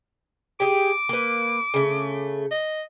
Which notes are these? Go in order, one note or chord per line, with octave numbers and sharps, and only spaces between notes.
G4 G#4 D6
A#3 B4
C#3 A3
D#5